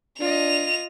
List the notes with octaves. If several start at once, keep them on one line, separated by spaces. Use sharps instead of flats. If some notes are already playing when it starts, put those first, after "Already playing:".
D4 F4 D#5 F7